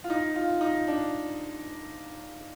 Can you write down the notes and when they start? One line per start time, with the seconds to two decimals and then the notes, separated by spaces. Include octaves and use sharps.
0.04 F4
0.10 D#4
0.36 F4
0.61 D#4
0.87 D4